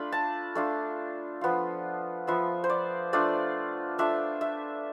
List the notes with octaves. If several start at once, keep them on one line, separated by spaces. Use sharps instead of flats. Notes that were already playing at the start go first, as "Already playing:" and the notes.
Already playing: A3 D4 F4 B5
A5
A3 D4 F4
F3 B3 F4
F3 B3 F4 E5
C5
D5
A3 D4 F4 D5
A3 D4 F4 E5
E5